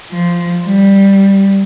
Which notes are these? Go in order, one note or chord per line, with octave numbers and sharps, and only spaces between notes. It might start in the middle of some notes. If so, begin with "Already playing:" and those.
F3
G3